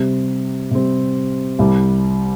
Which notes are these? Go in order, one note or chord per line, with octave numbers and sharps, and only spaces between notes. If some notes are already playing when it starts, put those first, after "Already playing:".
Already playing: C3 G3 C4 G4
C3 G3 C4 G4
C2 C3 G3